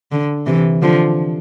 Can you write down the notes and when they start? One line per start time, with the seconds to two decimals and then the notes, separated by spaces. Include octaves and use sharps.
0.12 D3
0.46 C3 E3
0.82 D3 F3